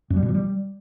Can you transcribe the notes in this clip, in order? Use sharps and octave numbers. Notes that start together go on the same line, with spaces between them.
F#2
G3
B2
E3
G3